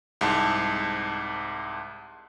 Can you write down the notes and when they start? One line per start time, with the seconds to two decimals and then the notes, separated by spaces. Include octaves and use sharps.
0.21 C2 G#2 A5